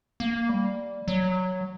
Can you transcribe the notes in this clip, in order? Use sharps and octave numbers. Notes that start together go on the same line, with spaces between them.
A#3
G3
F#3